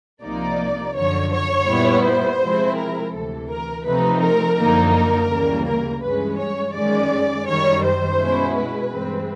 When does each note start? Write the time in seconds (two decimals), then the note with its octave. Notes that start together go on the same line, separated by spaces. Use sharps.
0.23 C2 C3 F3 A#3 D#4 D5
0.95 F#2 D3 F3 C#5
1.32 C#5
1.67 A#2 G3 B3 E4
2.04 C5
2.40 C3 F3 G#3 C4 E4
2.76 A#4
3.12 D2 C3 E3 A4
3.49 A#4
3.85 C3 F3 A3 C4 D#4 B4
4.21 A#4
4.57 F#2 D3 F3 A#3 D#4
4.93 A#4
5.29 D2 C#3 E3 G3 A#3
5.66 A#4
6.01 G2 E3 G#3 C#4 B4
6.37 C#5
6.74 F#2 D#3 G#3 C#4 D5
7.46 F#2 D#3 G3 C#5
7.83 C5
8.18 B2 G#3 C#4 E4
8.55 B4
8.91 G2 E3 G#3 C4